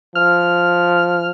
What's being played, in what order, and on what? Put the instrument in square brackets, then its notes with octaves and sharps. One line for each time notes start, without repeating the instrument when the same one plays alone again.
[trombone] F3 [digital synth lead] F6